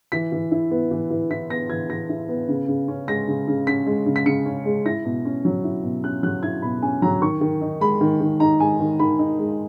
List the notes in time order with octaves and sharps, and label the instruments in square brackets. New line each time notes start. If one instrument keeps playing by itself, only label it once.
[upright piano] E3 B6
E3
E4
B3
E3
E3
E4 B6
B3 A#6
E3 G#6
E3 A#6
E4
B3
C#3
C#3
C#4
G#3 A#6
C#3
C#3
C#4 B6
G#3
C#3
B6
C#3 C#7
C#4
G#3
E4 A#6
B2
C#4
F#3
E4
B2
C#4 F#6
F#3 F#6
E4 G#6
B2 B5
C#4 G#5
F#3 A#5
D#3 C#6
D#3
D#4
G#3 B5
D#3
D#3
D#4 A#5
G#3 G#5
D#3
D#3 B5
D#4
G#3